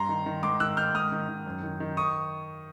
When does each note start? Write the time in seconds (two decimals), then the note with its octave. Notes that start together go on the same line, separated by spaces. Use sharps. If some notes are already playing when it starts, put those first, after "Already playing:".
Already playing: G2 A#5 C6
0.09 D#3
0.26 D#3
0.43 G#2 C6 D6
0.60 D#3 E6 F#6
0.77 D#3 F6 G6
0.95 G#2 D#6 F6
1.12 D#3
1.28 D#3
1.46 F#2
1.63 D#3
1.80 D#3
1.97 C#6 D#6